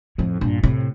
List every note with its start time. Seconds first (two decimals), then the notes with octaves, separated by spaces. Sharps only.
0.18 F2 A2 E4
0.41 G2 A#2 D4
0.63 A2 C3 E4